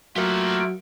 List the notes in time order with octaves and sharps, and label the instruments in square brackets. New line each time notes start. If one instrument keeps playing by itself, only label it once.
[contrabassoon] F#3 [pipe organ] A3 A#3 F4 [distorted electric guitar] G4 F#5 [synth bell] A#4 F5